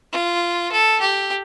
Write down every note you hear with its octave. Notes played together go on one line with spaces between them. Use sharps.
F4
A4
G4